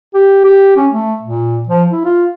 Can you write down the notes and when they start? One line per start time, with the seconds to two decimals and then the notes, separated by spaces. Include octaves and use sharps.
0.14 G4
0.44 G4
0.77 C#4
0.91 A3
1.22 A#2
1.69 F3
1.91 E4
2.05 F4